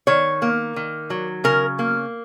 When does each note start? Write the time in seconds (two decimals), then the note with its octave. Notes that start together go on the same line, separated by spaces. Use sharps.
0.07 D#3 C#5
0.42 A#3
0.76 D#3
1.10 F#3
1.44 C#3 A#4
1.79 A#3